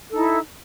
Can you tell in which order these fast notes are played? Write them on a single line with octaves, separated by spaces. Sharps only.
A4 D#4 E4